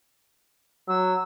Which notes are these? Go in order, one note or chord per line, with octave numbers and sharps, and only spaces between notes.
F#3 E6